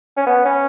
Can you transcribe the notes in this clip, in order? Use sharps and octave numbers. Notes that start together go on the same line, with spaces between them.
C#4
B3
C#4